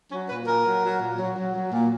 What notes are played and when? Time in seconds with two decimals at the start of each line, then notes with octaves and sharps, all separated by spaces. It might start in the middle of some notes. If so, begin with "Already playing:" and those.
0.11 F#3 C#4
0.29 A#2 B4
0.47 A#2 A#4
0.65 F#3
0.83 F#3
1.00 A#2
1.19 F#3
1.36 F#3
1.54 F#3
1.71 A#2